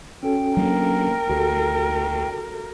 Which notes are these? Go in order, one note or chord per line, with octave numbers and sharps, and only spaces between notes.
C#4 F#4 A4 G5
F#3 A#3 D4 A#4
D2 F#4 G4 A4